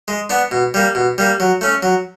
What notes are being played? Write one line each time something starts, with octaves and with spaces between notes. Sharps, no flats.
G#3
B3 D4
B2
G3 A#3
B2
G3 A#3
F#3
A3 C#4
F#3